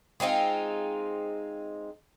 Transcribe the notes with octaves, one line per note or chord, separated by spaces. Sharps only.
G#3 C4 D#4 F4